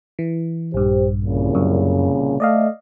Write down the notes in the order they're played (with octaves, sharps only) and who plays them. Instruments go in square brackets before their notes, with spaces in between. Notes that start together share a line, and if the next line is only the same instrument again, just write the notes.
[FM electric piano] E3
[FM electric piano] A#1 G2 [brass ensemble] G4 C5
[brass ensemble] C2 A#2 C#3
[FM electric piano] F#2
[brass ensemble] A3 [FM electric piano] D5 D#5 F5